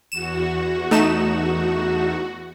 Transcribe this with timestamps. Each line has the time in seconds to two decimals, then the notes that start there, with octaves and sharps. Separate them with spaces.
0.12 E2 F#4 E7
0.91 A3 D#4 E7